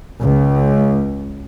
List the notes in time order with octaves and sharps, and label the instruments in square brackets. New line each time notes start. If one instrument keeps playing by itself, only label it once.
[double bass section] C#2